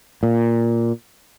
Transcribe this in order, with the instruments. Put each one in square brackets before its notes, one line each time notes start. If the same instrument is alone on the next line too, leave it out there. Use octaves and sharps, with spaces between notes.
[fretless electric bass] A#2